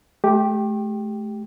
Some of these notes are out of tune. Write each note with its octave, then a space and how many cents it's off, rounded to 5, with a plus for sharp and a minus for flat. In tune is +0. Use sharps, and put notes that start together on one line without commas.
A3 -35 G4 +0